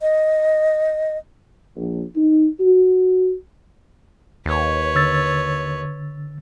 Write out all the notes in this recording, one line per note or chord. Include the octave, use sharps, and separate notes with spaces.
D#5
A#1
D#4
F#4
D#2 B4 C#5
D3 E6 A6